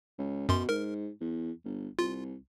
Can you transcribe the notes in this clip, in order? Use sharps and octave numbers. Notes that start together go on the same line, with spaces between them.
C#2
F#2 B2 C6
G#2 A#4
E2
G1
C2 F4